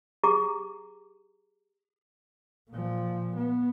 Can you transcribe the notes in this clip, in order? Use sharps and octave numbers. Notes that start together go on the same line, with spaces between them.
G4 G#4 A#5 D6
A#2 F3
B3